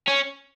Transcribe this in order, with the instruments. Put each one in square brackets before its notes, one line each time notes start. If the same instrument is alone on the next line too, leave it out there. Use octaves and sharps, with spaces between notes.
[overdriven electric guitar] C#4